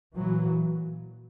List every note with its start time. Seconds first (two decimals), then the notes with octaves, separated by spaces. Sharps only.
0.15 A#2 E3 F#3